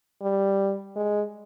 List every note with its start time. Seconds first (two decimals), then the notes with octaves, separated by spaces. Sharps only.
0.22 G3
0.96 G#3